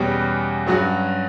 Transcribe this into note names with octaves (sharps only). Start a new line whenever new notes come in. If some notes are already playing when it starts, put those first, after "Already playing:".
Already playing: E2 B2 G3 C#4
G2 F#3 C#4 F#4